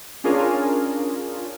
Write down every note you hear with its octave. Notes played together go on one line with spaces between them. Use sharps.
C#4 D4 F4 G#4 A#4